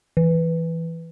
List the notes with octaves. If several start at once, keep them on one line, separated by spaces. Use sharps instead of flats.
E3